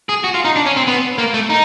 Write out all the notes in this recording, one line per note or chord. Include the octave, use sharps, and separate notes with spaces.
G#4
F#4
F4
D#4
D4
C#4
C4
B3
A#3
A3
D#4